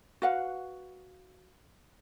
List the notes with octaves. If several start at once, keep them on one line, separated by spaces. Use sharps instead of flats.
F#4 B4 F5 F#5